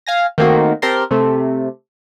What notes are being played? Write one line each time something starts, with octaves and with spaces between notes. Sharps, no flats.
F5 G#5 A#6
D#3 A3 A#3 C4 F#4
C4 G4 A#4 A5 C6
C3 A3